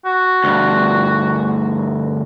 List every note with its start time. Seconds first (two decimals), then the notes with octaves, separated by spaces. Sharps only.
0.05 F#4
0.44 D2 G2